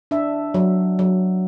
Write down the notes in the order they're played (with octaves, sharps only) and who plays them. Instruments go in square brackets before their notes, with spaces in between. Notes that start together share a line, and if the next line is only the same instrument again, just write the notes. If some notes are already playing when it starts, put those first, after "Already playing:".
[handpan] D4 E5
F#3
F#3